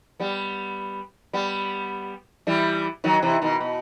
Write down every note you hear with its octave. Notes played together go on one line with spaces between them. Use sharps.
G3 B3
G3 B3
E3 G3
D#3 F#3
C3 E3
B2 D#3
B2